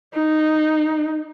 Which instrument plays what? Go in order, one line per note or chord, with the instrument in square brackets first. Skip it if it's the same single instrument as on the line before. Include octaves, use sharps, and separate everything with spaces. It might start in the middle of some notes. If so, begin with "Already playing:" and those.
[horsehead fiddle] D#4